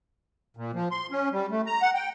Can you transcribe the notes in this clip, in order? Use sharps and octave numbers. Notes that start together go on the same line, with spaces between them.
A#2
F3
C6
C#4
G3
A3
A#5
F#5
G5